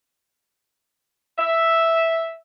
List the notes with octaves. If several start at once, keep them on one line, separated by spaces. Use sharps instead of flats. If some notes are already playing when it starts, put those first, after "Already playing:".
E5